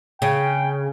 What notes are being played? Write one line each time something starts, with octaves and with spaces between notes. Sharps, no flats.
C#3 G5